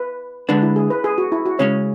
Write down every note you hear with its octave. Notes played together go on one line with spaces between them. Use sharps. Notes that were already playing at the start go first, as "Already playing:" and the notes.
Already playing: B4
D3 G#3 D4 B4
E4
G#4
B4
G#4
F#4
E4
F#4
C#3 G#3 C#4 C#5